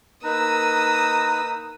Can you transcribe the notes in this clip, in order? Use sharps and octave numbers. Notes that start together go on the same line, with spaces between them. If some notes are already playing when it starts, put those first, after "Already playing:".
A#3 D#4 B4 A#5 D#6 E6